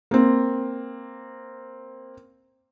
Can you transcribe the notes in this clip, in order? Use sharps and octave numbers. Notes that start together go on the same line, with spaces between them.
A#3 C4